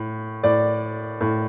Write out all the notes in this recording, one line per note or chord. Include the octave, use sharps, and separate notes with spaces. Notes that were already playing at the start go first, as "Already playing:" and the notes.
Already playing: A2
A2 D5
A2